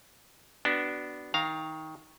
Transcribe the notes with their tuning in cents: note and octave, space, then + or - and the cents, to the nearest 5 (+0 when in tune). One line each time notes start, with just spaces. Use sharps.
B3 +0 D4 +0 F#4 +30
D#3 +20 F5 +0 A#5 +0